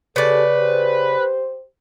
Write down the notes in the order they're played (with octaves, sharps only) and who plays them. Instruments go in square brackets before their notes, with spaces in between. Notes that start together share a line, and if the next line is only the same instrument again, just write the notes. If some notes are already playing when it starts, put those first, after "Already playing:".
[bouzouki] C#3 D5 [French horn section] G4 A4 [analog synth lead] B4
[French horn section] G4 C5